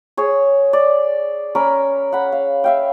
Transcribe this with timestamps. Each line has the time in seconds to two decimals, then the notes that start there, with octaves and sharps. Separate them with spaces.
0.17 G#4 C#5
0.73 D5
1.55 C#4 A#4 B5
2.12 F#5 B5
2.32 F5
2.64 E5 F5 G5